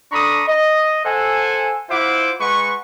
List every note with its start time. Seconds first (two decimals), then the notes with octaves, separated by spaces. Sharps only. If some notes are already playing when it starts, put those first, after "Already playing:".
0.12 D4 A4 A#5 B5 C#6 D#6
0.47 D#5
1.05 A4 C5 F#5 G#5
1.89 E4 F4 C5 E5 F#5 D6
2.40 G#3 B4 F#5 C#6